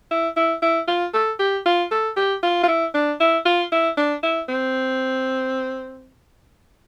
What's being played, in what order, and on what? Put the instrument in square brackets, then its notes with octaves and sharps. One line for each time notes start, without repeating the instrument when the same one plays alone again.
[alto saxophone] E4
E4
E4
F4
A4
G4
F4
A4
G4
F4
F4
E4
D4
E4
F4
E4
D4
E4
C4